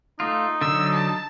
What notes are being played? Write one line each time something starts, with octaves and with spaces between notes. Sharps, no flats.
A3 D#4 F4
D3 F#3 E6
A5